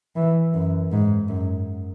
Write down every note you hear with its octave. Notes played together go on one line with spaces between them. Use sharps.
E3
F#2
G#2
F#2